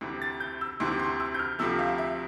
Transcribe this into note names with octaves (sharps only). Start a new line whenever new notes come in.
D2 C3 E3
A6
G6
E6
D2 C3 E3 C6
C6
E6
G6
F6
D2 C3 F3 A3 E6
F5
E5